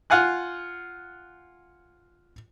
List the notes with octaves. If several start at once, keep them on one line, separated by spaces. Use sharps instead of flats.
F4 F5 F#5 G#5 F#6